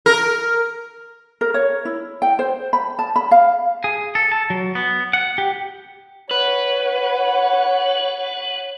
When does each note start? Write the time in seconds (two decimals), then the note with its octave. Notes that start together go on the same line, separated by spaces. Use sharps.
0.06 A#4
1.41 A#4
1.54 C#5
1.85 E4
2.22 G5
2.39 C5
2.73 B5
2.99 A5
3.16 B5
3.31 F5
3.84 G#4
4.15 A4
4.32 A5
4.50 F#3
4.75 B3
5.13 F#5
5.38 G4
6.31 B4 C#5 F#5